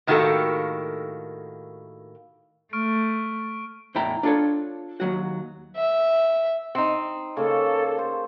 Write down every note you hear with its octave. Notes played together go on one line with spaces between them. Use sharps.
A2 D#3 A#3 F#4 G4 A4
A3 C#6 F6 D7
E2 A2 E4 G5 A#5
D4 F4 A4 C#5
D#2 F#3 F#4
E5
C4 D#4
C#3 A#3 A4
C5